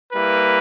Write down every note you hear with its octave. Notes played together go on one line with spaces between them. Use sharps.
G3 A#3 E4 B4